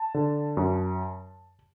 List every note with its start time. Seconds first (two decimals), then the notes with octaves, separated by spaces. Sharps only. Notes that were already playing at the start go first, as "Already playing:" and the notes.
Already playing: A5
0.14 D3
0.57 F#2